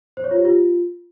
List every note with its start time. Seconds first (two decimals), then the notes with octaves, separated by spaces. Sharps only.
0.17 C5
0.24 C#5
0.31 F4
0.38 G4
0.45 F4